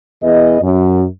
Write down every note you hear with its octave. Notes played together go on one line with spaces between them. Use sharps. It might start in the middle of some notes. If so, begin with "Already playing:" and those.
E2 E3 B3 G#4 D#5
F#2